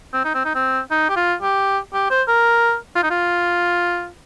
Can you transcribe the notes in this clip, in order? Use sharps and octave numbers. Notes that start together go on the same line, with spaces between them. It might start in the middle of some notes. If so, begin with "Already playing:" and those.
C4
D#4
C4
D#4
C4
D#4
G4
F4
G4
G4
C5
A#4
F4
D#4
F4